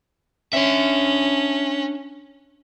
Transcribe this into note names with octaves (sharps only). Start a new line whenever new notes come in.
C#4 D4 E5